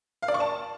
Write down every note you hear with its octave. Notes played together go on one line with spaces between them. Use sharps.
F5
D5
C#6
A5